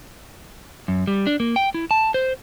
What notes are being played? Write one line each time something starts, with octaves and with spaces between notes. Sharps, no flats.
F#2
G3
D4
A#3
G5
E4
A5
C5